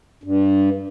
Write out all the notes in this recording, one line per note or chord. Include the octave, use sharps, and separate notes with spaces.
G2